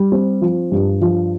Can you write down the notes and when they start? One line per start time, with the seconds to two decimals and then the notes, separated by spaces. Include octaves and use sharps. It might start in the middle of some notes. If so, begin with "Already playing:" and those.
Already playing: G3
0.12 C4
0.41 F3
0.72 G2
1.01 F3